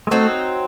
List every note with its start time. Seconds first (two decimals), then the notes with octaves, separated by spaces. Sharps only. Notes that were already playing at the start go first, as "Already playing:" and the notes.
0.07 G#3
0.11 F#3 A3 C4 D#4